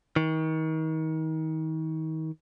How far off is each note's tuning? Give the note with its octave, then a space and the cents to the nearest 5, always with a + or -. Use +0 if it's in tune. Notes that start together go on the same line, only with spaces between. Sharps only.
D#3 +35